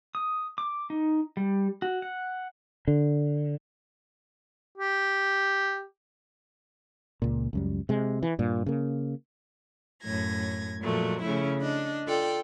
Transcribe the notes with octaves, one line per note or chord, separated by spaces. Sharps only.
D#6
D6
D#4
G3
F#4
F#5
D3
G4
C#2 A#2
C#2 F#2 G3
C3 G#3
E3
G2 A#2
C#3 A#3
F#2 A2 G#6 A#6
A#2 F3 F#3 G#3 A3
C#3 A3 C#4 E4
D4 D#5
F4 A4 D5 G5